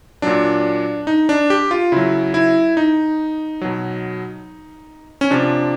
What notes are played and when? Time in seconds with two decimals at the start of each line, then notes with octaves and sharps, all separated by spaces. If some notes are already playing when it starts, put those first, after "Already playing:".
0.22 A#2 F#3 D4
1.07 D#4
1.29 D4
1.50 G4
1.71 F4
1.92 C#3 F#3 E4
2.34 E4
2.77 D#4
3.61 B2 F#3
5.21 C#4
5.31 C3 F3 D4